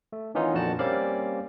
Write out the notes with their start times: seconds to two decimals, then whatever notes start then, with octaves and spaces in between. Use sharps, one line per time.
0.13 A3
0.35 D#3 E3 B3 C#4 D#4 F4
0.54 F2 A#2 D4 F#4 A5
0.79 G3 A#3 C4 C#4 D5 F5